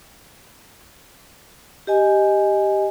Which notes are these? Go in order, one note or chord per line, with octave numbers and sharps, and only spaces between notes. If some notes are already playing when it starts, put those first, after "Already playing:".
G4 D#5 G#5